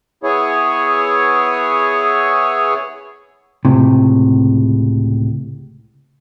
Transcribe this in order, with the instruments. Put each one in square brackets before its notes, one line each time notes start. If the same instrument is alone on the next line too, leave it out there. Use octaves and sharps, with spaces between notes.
[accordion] B3 E4 G#4 C#5
[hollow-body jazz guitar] C#2 A2 C3